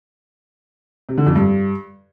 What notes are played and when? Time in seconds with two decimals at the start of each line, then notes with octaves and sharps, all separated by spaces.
1.09 C3
1.18 D3
1.27 F2
1.36 G2